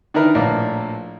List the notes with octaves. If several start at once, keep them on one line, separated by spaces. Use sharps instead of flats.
D#3 D4 E4 A#4 B4
A#1 A2 A#3 D5